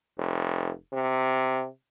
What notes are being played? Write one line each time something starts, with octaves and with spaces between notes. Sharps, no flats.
F1
C3